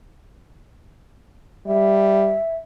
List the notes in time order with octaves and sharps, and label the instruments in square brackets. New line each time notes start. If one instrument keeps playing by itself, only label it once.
[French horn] G3 [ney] E5